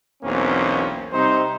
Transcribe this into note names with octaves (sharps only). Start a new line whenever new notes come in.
B1 E2 A#3 C4 C#4
C3 G3 C4 D#4 C5